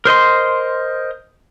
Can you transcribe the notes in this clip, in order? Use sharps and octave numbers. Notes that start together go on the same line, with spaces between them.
A#4 C5 D#5 C6